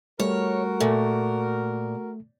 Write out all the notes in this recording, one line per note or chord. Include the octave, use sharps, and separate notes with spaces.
G3 A3 F#4 A#4 C#5
A#2 A3